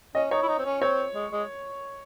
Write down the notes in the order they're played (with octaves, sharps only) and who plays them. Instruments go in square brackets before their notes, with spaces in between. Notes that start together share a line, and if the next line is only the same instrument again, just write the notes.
[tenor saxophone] C#4 [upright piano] D#5
[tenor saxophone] D#4 [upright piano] C#5
[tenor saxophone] E4
D#4
C4
C#4
[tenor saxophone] C4 [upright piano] C#5
[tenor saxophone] G#3
G#3